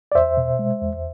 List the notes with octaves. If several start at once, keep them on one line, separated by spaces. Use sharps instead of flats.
D5
E2 C5 E5
B2
G#3
E2